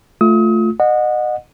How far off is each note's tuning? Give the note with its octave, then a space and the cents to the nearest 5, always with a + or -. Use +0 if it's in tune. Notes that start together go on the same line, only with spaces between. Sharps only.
A3 +0 F4 +10 D#6 +35
D#5 -30 F#5 -20